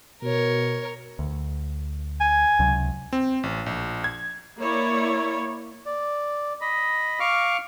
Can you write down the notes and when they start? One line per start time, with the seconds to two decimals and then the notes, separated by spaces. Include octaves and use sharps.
0.23 B2 A#4 C#5
1.19 D2
2.20 G#5
2.59 C#2 C3 F#3
3.13 C4
3.43 A1
3.66 A#1
4.04 G#6
4.58 A#3 E4 C#5 D5
5.86 D5
6.61 D#5 B5
7.20 F5 C#6 D6 F6